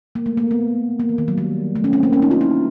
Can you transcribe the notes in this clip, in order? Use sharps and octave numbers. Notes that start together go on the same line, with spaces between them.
A#3
A3
A#3
B3
A#3
E3
D#3
F#3
G3
A3
C#4
C4
A#3
C#4
D#4
F4
E4